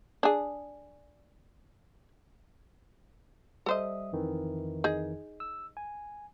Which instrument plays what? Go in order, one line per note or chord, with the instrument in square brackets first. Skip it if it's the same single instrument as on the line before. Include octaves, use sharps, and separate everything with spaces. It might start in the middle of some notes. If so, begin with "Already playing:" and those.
[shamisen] D4 G#4
[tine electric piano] G3 E5 D#6 [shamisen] A4 C5 D#5
[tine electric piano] F2 D#3 E3
[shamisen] D#4 G#4
[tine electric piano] E6
G#5